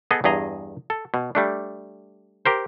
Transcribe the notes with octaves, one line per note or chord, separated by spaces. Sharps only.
B3 G#4 A4 D#5
E2 G2 G#4 D#5 A#5
A4
B2
G3 A3 D4
G4 A#4 C5